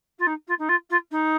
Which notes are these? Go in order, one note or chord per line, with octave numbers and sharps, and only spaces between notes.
F4
D#4
F4
D#4
F4
F4
D#4